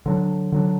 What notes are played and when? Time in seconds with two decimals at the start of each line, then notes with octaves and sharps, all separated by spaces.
0.06 D3 F#3 D4
0.52 D3 F#3 D4